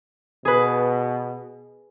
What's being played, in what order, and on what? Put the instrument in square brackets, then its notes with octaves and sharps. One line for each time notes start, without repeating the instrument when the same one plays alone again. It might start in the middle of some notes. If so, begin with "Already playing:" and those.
[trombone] B2 [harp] G#4 B4